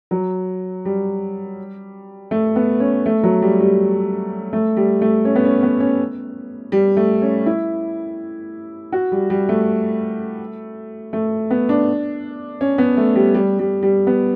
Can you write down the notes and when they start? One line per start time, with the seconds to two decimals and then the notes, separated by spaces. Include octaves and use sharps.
0.11 F#3
0.85 G3
2.31 A3
2.56 B3
2.80 C#4
3.06 A3
3.23 F#3
3.42 G3
3.61 G3
4.53 A3
4.77 G3
5.01 A3
5.25 C#4
5.36 B3
5.45 C#4
5.63 B3
5.80 C#4
6.72 G3
6.97 A3
7.22 C#4
7.46 E4
8.92 F#4
9.12 G3
9.30 G3
9.49 A3
11.13 A3
11.51 B3
11.69 D4
12.61 C#4
12.78 B3
12.97 A3
13.15 G3
13.34 G3
13.59 G3
13.83 G3
14.07 B3